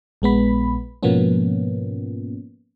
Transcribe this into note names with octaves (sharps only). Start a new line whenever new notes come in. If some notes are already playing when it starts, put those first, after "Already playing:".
A#1 G#3 B3 B5
G#2 B2 F3 A#3 B3 C#4